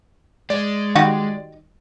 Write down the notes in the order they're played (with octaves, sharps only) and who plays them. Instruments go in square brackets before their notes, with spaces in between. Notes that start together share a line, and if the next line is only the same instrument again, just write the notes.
[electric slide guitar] G#3 [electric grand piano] D5
[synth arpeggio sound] D#3 G3 [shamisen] D#4 F#4 G4